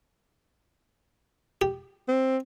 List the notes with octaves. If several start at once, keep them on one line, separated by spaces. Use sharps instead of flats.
G4
C4